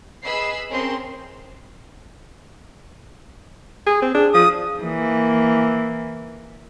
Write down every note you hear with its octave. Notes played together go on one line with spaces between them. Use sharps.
G#4 B4 D#5 B5 E6 C7
C4 C#4 G#4 A#4 C6
G#4
C4
D4 G#4
F3 D#6
E3 A#3